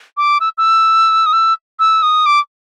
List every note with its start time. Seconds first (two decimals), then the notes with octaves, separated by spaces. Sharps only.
0.17 D6
0.40 E6
0.58 E6
1.26 D#6
1.33 E6
1.80 E6
2.03 D#6
2.26 D6